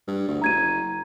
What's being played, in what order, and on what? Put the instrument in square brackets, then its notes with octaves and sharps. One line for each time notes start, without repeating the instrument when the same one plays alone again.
[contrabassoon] G2
D2
[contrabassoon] F#1 [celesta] A#5 G#6 D#7